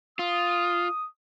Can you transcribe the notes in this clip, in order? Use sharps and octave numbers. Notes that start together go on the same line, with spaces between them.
F4 D#6